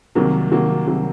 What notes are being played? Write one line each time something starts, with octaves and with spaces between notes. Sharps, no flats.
C2 C3 D#3 F#3 A#3
C2 C3 D#3 F#3 A#3
C2 C3 D#3 F#3 A#3